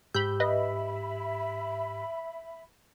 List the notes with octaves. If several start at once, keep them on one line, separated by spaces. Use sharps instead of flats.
G#2 G4 B5 E6 G6
B4 D#5 E5 B5